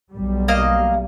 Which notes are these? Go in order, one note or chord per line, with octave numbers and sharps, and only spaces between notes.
B1 G3
A#3 D#5 F5